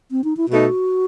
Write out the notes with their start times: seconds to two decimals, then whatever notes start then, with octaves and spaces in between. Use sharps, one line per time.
0.11 C4
0.24 D#4
0.37 E4
0.50 B2 A3 D#4 F#4